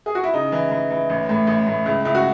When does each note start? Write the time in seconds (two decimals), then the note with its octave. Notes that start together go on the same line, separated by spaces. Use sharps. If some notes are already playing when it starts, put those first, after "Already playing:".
0.06 G#4
0.15 F#4
0.24 E4
0.34 C#3 D#4
0.52 E3
0.71 E3
0.91 E3
1.10 A1
1.29 A2
1.47 A1
1.67 A2
1.85 C#2 E4
2.05 C#2 E4
2.15 F#4